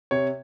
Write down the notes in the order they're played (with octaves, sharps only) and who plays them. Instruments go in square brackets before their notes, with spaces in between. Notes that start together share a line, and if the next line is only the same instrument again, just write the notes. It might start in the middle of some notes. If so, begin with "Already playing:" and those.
[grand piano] C3 C#5